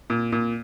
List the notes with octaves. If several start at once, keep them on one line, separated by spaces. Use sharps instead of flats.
A#2
A#2